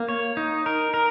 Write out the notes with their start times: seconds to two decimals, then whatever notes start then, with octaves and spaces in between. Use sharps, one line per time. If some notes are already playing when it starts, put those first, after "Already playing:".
Already playing: A#3
0.09 C#5
0.37 D#4
0.66 A#4
0.94 A#4